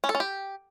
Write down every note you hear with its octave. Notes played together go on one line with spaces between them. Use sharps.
C#4
A4
C#4
G4